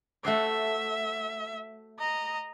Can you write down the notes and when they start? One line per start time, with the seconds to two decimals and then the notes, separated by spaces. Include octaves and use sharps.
0.25 A3 F#4 C5 E5
1.99 D#5 A#5